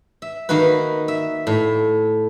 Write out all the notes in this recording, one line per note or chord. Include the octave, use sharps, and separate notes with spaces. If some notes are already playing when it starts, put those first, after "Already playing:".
E5
D#3 A#3 D#4 F#4 B4
E5
A2